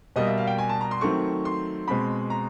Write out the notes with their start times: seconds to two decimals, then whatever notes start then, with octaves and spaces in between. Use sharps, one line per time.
0.16 B2 G3 A#3 D#5
0.27 E5
0.38 F5
0.47 G5
0.58 G#5
0.69 A5
0.81 A#5
0.91 C6
1.01 D#3 F#3 A3 C4 C#6
1.45 C6
1.88 B2 G#3 C4 B5
2.30 A#5